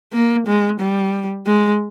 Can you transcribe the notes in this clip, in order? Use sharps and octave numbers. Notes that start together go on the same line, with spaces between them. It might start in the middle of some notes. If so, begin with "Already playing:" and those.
A#3
G#3
G3
G#3